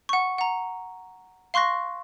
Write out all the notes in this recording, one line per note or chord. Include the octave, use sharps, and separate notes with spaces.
F#5 C#6
F#5 A#5
F5 C6 C#6 F#6 A#6